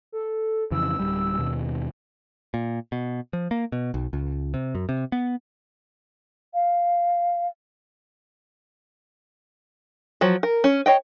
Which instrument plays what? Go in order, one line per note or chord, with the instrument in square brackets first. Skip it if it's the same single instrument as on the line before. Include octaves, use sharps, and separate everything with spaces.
[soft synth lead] A4
[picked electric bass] F2 C#3 E3 [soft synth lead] E6
[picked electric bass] D1 G3
D#2 B2
A#2
B2
F3
A#3
B2
B1
C#2
C3
F#2
C3
B3
[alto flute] F5
[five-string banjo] F3 F#3
A#4
C#4
C#5 D#5 G5